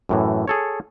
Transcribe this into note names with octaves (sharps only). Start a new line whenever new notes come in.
F#2 A2 E3
G#4 A4 C#5